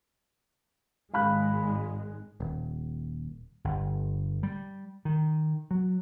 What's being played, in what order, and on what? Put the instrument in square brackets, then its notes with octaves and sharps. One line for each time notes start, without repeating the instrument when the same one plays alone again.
[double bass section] G#1 G#3 [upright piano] F5 B5 F#6
[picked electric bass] D#1
[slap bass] G1
G3
D#3
F#3